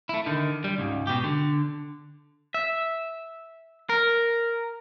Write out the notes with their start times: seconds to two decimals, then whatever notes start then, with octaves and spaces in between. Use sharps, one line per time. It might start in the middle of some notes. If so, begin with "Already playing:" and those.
0.09 A3 E4
0.26 D3 D#3
0.64 G3
0.78 C#2 G#2
1.07 B2 G4
1.24 D3
2.54 E5
3.89 A#4